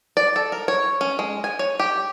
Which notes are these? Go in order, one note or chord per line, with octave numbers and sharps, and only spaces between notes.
D5
A4
A#4
C#5
C#4
G#3
G#5
C#5
G4